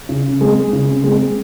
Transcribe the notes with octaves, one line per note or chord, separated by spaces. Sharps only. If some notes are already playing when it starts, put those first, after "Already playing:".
C#3
G#3 C4
C#3
G#3 C4